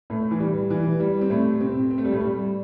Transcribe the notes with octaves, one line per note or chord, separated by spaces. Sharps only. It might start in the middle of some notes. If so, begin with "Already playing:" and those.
A2 A3
E3
G3
E3
G3
C4
A2 A3
C3 C4
C4
A3
G3
A2 A3
G3